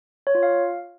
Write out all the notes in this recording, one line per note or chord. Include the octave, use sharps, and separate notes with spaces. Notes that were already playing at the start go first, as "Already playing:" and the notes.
C#5
F4
F5